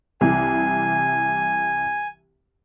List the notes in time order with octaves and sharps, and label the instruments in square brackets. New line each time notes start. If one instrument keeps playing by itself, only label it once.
[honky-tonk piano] C2 E3 [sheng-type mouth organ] G#5